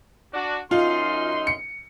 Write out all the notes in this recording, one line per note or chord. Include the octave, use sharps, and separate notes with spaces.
D4 F#4
F#2 D#4 F4 C6
C#7